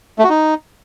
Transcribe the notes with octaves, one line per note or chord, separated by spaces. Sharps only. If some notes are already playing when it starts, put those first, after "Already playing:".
A3
F#4
D#4